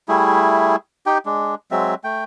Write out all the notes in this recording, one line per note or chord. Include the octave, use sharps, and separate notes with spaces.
G3 A3 E4 G#4
D#4 G4 G5
G#3 D4
F#3 G#3 C4 E5
A3 G5